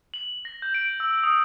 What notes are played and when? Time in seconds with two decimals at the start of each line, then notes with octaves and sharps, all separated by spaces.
0.14 F#7
0.45 A#6
0.62 G6
0.74 D7
1.00 E6
1.23 D#6